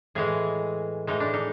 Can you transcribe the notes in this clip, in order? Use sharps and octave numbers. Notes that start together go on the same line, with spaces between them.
A2 E3 G#3 G#4
A2 E3 G#3 D#4
D4
D#4